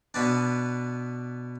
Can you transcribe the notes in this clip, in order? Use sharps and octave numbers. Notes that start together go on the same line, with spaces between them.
B2 B3 D4